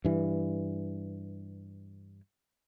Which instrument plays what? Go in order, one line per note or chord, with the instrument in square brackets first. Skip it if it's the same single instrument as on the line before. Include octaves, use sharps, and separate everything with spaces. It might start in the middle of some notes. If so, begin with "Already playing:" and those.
[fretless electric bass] G2 E3